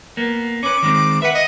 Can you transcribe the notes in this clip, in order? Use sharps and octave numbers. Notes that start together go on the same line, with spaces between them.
A#3 B3
C#4 B4 D6
D#3 G#3 C4
B4 E5 F#5
D#5